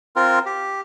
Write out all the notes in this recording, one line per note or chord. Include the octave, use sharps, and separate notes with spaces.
C4 F4 A#4
G4